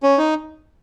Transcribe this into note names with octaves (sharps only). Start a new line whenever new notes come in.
C#4
D#4